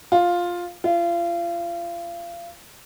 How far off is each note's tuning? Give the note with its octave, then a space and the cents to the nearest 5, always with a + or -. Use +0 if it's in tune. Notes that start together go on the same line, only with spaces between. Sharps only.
F4 +5
F4 -35